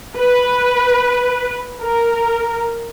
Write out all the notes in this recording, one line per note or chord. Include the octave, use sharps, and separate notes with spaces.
B4
A#4